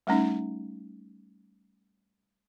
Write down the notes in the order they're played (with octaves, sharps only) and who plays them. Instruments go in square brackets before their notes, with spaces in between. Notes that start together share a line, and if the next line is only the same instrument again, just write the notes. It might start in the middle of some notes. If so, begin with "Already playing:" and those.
[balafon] G3 A3 C#4 D#4